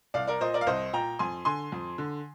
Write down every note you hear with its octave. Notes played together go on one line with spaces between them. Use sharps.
C2 D5 F5
A#4 D5
A#2 C5 D#5
A#4 D5
F5
C2 C5 D#5
A#2 G5 A#5
F2 G#5 C6
D3 G#5 C6
F2
D3